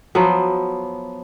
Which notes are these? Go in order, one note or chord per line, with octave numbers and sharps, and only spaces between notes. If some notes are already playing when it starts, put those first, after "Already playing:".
F3 F#3 B3